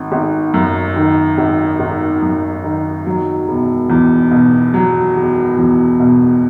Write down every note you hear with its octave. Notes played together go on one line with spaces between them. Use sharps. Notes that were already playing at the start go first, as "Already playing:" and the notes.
Already playing: G#1
G#1
F#2
D#3
G#1
G#1
F#2
D#3
F#3
E1
E2
B2
F#3
E1
E2
B2